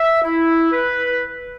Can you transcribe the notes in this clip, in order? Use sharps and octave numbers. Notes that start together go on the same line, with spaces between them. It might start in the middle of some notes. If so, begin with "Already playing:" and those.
Already playing: E5
E4
B4